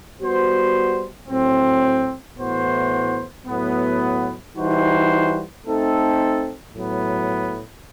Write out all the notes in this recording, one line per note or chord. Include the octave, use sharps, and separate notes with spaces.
G3 B3 F#4 C5
A2 F#3 C4
A2 E3 B3 F#4 C5
A2 F#3 B3
E3 G3 D#4 F#4 C5
A3 C4 D#4 A4
A2 F#3 B3